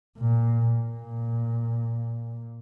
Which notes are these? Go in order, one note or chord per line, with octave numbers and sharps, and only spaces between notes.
A#2
A#2